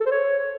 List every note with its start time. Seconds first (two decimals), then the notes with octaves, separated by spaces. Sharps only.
0.01 A4
0.06 C5
0.11 C#5